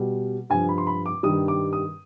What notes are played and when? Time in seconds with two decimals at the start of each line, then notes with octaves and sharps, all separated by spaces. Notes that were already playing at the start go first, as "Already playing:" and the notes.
Already playing: B2 G3
0.50 G2 F3 G#5
0.69 B5
0.78 C6
0.87 B5
1.06 D6
1.23 G2 D#3 G3 D#6
1.48 D6
1.73 D#6